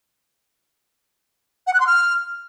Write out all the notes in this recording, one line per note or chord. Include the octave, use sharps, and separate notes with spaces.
F#5
F#6
C6
F6